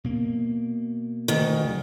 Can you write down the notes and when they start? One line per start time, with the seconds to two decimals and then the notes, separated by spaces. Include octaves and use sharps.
0.04 B2 A#3
1.28 D2 D#3
1.65 C#3 F#3